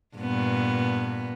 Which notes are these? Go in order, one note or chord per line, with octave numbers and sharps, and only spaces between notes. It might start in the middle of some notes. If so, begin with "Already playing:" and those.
G2 A#2 B3